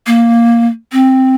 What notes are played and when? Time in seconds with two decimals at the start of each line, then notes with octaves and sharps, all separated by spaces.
0.06 A#3
0.92 C4